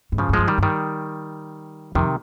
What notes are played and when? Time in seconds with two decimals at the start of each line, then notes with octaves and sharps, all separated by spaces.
0.12 G#2
0.18 G2 C#3 F3
0.29 G#2
0.33 G2 F3 G#3
0.48 D#3 G3
0.58 G2
0.63 D#3 G3
1.95 F2 C3 D#3